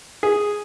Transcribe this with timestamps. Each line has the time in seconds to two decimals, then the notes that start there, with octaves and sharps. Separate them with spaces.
0.23 G#4